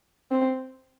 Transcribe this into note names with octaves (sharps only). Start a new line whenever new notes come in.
C4